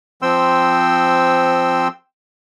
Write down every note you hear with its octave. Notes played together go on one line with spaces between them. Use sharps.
F3 C4 G5 C6 E6